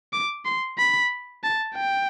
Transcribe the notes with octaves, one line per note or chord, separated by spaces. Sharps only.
D6
C6
B5
A5
G5